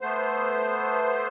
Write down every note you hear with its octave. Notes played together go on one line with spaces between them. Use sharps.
A3 B3 C5